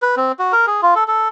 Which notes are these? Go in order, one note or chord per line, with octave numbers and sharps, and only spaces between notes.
B4
C4
F#4
A#4
G#4
F4
A4
A4